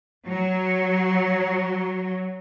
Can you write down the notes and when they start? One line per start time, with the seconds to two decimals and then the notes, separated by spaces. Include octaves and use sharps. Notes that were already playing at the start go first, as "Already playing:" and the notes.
0.26 F#3